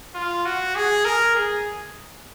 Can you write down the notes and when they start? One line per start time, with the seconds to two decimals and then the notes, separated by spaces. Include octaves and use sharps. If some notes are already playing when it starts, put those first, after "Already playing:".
0.15 F4
0.45 F#4
0.76 G#4
1.05 A#4
1.35 G#4